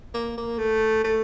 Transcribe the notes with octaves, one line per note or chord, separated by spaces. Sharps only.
A#3
A#3
A3
A3